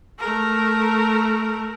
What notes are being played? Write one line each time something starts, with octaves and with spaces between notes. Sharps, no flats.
A3 A#4